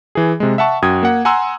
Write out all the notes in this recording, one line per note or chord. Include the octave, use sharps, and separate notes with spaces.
E3 G#4
C3 G#3
E5 F#5 A5 C#6
F#2 F#4 G5 D#6 G#6
A#3 F#5
F#5 G#5 A#5 C6 E6